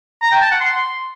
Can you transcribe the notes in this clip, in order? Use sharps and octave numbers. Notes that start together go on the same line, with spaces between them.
A#5
G5
A5
F#5
C6